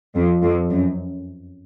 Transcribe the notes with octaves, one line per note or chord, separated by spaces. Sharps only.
F2
F2
F#2